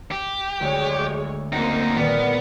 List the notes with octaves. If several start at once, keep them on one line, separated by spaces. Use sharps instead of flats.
G4
D2 F#3 G#3 C#5
F#2 A#3 C4 D#4 C5 F#5
D#1 B3 A#4 D5